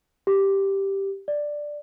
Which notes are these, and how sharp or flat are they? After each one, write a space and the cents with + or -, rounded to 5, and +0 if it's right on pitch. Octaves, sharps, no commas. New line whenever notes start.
G4 +0
D5 +5